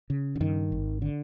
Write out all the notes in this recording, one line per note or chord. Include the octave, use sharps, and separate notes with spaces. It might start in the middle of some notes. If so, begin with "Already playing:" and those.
C#3
D3
G2 D#3
G#1
D3